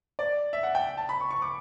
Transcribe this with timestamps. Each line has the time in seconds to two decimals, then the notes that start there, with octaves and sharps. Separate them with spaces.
0.19 D5
0.53 E5
0.63 F#5
0.75 G5
0.97 A5
1.09 B5
1.20 C#6
1.31 C#6
1.42 D6